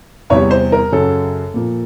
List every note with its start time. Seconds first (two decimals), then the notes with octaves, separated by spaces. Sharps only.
0.30 E2 C3 E3 G3 C#5
0.51 C5
0.72 A#4
0.92 F#2 C#3 F#3 A4
1.54 A#2 F3 A#3